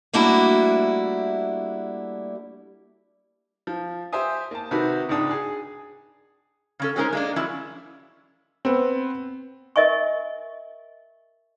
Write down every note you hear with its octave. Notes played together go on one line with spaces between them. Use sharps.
G3 A3 A#3 D4 E4 F#4
F3
G4 C5 E5 G#5 D#6
A#3 A5
C3 D#3 F#4 B4
C#2 G#2 D4 D#6
G#4
C#3 C#4 A4
F#3 G#3 C#4 D#4 A#4 C5
G#3 A#3 D4
F3 F#3 C#4 E4
B3 C4
A#4 D#5 E5 G#5 C#6